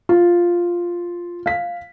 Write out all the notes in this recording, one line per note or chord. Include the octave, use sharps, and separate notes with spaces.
F4
F5 B6